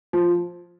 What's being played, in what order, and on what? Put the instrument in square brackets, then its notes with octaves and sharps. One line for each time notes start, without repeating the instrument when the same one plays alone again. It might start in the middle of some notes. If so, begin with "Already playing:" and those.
[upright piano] F3